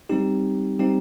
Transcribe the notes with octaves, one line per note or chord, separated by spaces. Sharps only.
G3 C4 D#4 G4
G3 C4 D#4 G4